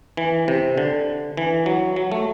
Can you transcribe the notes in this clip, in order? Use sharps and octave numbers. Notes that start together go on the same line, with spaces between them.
E3
C3
D3
E3
F#3
F#3
A3